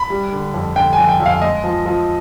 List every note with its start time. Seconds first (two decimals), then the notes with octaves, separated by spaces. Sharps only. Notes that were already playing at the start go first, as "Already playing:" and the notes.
Already playing: B5
0.10 G3
0.32 D3
0.54 F2
0.76 D3 G5
0.93 G#5
0.98 F2
1.09 G5
1.20 F2
1.26 F5
1.42 G#3 D#5
1.64 F3
1.86 F3